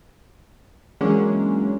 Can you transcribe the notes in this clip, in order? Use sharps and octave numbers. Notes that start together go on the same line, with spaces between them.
E3 F#3 G#3 A#3 C#4 D4